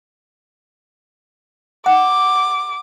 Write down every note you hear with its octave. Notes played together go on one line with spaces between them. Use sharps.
F#5 D6